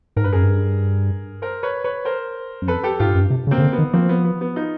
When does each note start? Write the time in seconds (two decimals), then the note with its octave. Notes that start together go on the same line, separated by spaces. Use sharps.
0.16 G#2 A#4
0.24 G2 B4
0.33 F#2 G#4 A#4
0.44 G2
1.42 A#4 C5
1.63 B4 C#5
1.84 B4 C#5
2.05 A#4 C5
2.62 F#2
2.67 F2 A4 B4
2.83 G4 A4
3.00 G#2 F4 G4
3.06 G2
3.14 F#2
3.21 G2
3.30 C3
3.47 C#3
3.51 A#3 C4
3.58 C#3
3.62 D3
3.73 B3
3.78 D#3
3.93 F3 A#3 C4
4.09 B3
4.24 B3
4.41 B3
4.56 D#4 F4